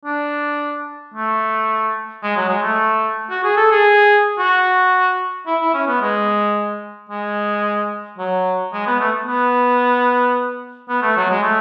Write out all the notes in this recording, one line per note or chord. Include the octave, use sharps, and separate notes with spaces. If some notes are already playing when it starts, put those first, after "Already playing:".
D4
A3
G#3
F#3
G#3
A3
F#4
G#4
A4
G#4
F#4
E4
E4
C#4
B3
G#3
G#3
F#3
G#3
B3
A3
B3
B3
A3
F#3
G#3
A3